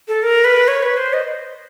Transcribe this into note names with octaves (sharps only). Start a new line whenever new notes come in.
A4
A#4
B4
C#5
B4
C5
D#5